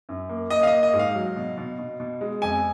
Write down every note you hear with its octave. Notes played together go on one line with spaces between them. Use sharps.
F#2
A#3
A#3 D#5
F5
D#5
A#3
D#5
G#2
F5
F#3
B2
B2
B2
B2
G#3
F2 G#5